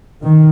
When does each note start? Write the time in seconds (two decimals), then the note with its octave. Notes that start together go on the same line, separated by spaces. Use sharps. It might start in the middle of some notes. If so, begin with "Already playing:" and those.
0.24 D#3